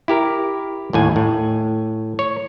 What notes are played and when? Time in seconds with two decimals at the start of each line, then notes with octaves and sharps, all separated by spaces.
0.08 E4 G4 A#4
0.93 D#2 A2 G#5
1.16 A2
2.19 C#5